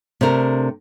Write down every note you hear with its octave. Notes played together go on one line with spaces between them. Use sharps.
C3 A3 D4 A#4